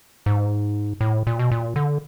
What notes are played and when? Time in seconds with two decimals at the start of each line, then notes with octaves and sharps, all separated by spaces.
0.26 G#2
1.01 A2
1.27 A#2
1.39 B2
1.52 A#2
1.76 D3